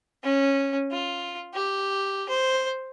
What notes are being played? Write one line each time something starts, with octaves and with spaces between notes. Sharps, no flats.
C#4
F4
G4
C5